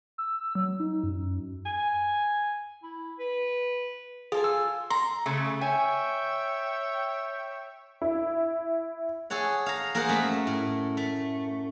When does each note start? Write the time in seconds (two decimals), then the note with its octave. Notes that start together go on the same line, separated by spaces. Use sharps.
0.18 E6
0.55 F#3
0.80 D#4
1.03 F#2
1.66 G#5
2.83 E4
3.19 B4
4.32 F4 G#4 A4 G#5
4.44 E6
4.90 A#5 C6
5.26 C#3 A3 C#4
5.61 C#5 E5 G5 G#5
8.02 E4
9.30 G#4 A4 C#5 F#5
9.66 F5 A#5
9.95 A#3 G#4 A#4 C5 F#5
10.09 F#2 A3 B5
10.47 A2
10.97 A3